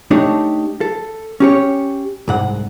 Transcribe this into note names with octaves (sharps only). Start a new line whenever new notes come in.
A3 D4 D#4 G4 C#5
A4
C#4 G4 C#5
C2 G#2 F#5